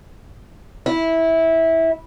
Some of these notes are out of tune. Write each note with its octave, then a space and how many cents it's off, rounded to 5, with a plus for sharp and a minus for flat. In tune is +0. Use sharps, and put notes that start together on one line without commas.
E4 -15